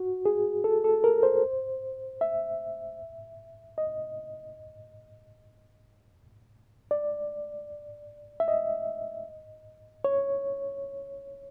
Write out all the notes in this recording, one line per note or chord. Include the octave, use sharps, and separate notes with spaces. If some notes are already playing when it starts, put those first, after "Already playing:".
Already playing: F#4
G#4
A4
A4
A#4
C5
E5
D#5
D5
E5
D#5
C#5